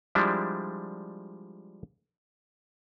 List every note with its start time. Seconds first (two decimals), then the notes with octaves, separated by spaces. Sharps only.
0.15 F3 G3 G#3 D4 E4